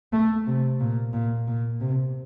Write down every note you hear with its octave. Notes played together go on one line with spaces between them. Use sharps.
A3
C3
A#2
A#2
A#2
C3